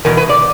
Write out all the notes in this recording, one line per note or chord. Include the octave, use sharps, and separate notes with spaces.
E2 B2 A#4
B4
D5